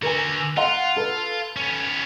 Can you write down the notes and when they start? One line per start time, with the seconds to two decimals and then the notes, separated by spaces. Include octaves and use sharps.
0.02 D3 F#4 A#4 B4 G#5
0.57 F4 F5 F#5 C6
0.96 A4 B4
1.56 B3 C#4